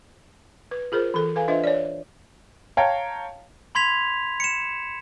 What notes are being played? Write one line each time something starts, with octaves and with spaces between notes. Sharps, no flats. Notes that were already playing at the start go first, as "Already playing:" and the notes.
B4
F4 G#4 A#4 C5
E3 A4
A4 B4 F5 G#5
D4 F4 B4 C5 D#5 E5
C#5 D5
C#5 F5 G5 A5 A#5
B5 C6 G#6 B6 F7
C#7 E7